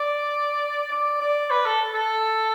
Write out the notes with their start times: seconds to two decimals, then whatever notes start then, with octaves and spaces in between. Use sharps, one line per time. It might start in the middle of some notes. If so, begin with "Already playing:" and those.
Already playing: D5
0.91 D5
1.21 D5
1.51 B4
1.65 A4
1.94 A4